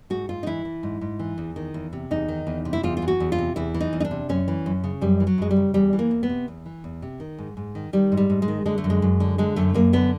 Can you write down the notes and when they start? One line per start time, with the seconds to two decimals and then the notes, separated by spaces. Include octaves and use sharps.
0.10 G#2 F#4
0.29 G#2 F4
0.43 D#4
0.46 E3 E4
0.65 E3
0.83 G#2
1.01 G#2
1.19 E3
1.38 E2
1.56 D#3
1.74 E2
1.93 C3
2.11 E2 D#4
2.28 D#3
2.47 E2
2.65 C3
2.73 E4
2.83 E2 F4
2.97 F4
3.02 E3
3.08 F#4
3.20 E2
3.32 F4
3.38 C3
3.56 E2 E4
3.74 E3
3.80 D#4
3.93 E2
4.00 D#4
4.05 D4
4.11 C3
4.29 F#2 C#4
4.48 E3
4.66 F#2
4.84 C#3
5.01 F#2 G3
5.20 E3
5.27 F#3
5.38 F#2 G#3
5.51 G3
5.56 C#3
5.74 E2 G3
5.93 E3
5.99 A#3
6.11 E2
6.23 B3
6.29 C3
6.48 E2
6.66 E3
6.84 E2
7.02 C3
7.20 D#3
7.38 G#2
7.57 G#2
7.75 D#3
7.93 D#3 G3
8.12 G#2
8.17 G3
8.30 G#2
8.42 G#3
8.48 D#3
8.65 D3 G#3
8.78 A3
8.84 F#2
8.90 G#3
9.02 F#2
9.20 D3
9.38 D3 G#3
9.56 F#2 A3
9.74 F#2 A#3
9.93 D3 B3